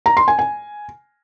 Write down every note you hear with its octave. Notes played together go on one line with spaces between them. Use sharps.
A#5
C6
G#5
G#5